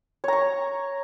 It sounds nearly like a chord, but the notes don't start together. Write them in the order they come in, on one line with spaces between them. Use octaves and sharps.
C#5 A#5 C#6